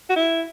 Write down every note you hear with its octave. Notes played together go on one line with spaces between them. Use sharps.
F#4
E4